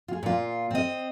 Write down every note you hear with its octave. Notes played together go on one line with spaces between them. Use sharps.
F4 G#4
A#2 F4
C4 D#5